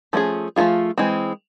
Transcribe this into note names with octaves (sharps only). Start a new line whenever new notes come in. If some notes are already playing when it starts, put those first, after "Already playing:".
F3 A3 C#4 F4 G#4
F3 A3 C#4 F4 G#4
E3 G#3 C4